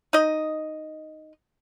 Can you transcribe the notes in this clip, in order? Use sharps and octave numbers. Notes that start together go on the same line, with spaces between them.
D#4 D#5